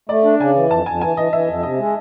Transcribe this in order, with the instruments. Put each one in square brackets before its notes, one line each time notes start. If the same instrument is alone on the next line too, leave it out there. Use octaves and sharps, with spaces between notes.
[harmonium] A3 [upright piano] D5
[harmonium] D4
[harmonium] C#3 [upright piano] G#5
[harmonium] E3
[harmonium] F2 [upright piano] A5
[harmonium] F2 [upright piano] G#5
[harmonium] E3 [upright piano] G#5
[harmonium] E3 [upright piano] D#5
[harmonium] E3 [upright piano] E5
[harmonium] F2
[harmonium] C3 [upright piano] D#5
[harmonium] G#3